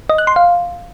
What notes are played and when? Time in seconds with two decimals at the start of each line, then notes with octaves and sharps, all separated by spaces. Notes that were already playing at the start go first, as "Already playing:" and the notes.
0.10 D#5
0.18 F#6
0.27 C6
0.36 F5